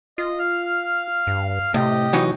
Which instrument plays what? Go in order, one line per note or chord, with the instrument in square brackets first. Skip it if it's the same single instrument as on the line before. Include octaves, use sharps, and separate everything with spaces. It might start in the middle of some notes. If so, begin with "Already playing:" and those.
[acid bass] F4 [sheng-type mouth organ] D#5
[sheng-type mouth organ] F5 F6
[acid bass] G2
[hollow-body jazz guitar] A2 [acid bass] C3 [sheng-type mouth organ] G4 D#5
[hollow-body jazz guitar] E3 F#3 D#4